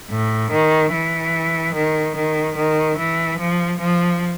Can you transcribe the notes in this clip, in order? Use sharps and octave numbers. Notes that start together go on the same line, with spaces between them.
A2
D#3
E3
D#3
D#3
D#3
E3
F3
F3